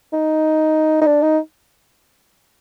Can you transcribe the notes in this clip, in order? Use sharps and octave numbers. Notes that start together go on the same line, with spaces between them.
D#4
D#4
D4
D#4